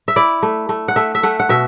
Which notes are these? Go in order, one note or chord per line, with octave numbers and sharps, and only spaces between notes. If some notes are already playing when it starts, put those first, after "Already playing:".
E5
E4 D5
A3
A3
F#5
A3 E5
E5
A3 F#5
F#5
B2 E5